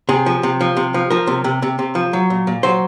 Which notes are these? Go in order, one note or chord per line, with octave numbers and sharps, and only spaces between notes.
C3 G#4
F3
C3
F3
C3
F3
F3 A#4
C3
C3
C3
C3
F3
F#3
A#2
A#2
F#3 C5